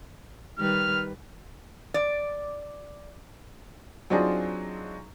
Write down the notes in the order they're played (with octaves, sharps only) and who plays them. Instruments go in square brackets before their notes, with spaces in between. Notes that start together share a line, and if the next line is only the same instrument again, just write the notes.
[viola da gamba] D#3 G3 B4 [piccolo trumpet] F6
[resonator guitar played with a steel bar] D5
[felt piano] F#3 C4 D4 D#4 F4 G#4